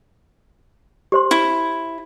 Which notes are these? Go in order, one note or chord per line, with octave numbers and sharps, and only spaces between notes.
G4 C5 C6
E4